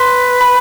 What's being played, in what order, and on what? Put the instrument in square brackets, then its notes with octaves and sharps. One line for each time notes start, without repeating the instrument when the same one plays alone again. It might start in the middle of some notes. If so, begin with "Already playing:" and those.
Already playing: [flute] B4 [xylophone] C6
[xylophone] B5